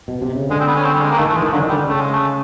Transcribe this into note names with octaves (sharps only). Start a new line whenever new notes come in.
B2
C3
C#3
D3 G#3
C4
B3
C#4
C4
G3
G#3
A#3
D#3 A3
E3 A3
G#3
D#3 F3
D3 F#3
D#3
G3
D3
C#3 A3
G#3
A3